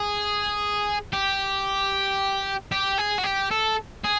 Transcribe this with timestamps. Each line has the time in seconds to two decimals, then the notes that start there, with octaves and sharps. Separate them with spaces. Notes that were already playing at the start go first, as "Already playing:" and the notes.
Already playing: G#4
1.13 G4
2.72 G4
2.98 G#4
3.19 F#4
3.24 G4
3.51 A4
4.04 G#4